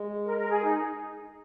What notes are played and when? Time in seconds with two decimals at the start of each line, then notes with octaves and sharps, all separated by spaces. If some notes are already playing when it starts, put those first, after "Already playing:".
Already playing: G#3
0.24 A#4
0.37 A#4
0.50 G#4
0.63 D#4